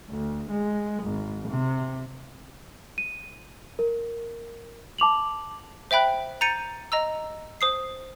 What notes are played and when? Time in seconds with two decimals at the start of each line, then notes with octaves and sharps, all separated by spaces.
0.10 D2
0.51 G#3
1.04 G#1
1.49 C3
2.98 D#7
3.79 A#4
4.98 A5 D6 F7 F#7
5.91 C5 E5 G5 B5 F#6
6.41 A#5 G6 A6 C#7 D#7
6.92 D#5 A#5 E6
7.61 C5 D#6 C7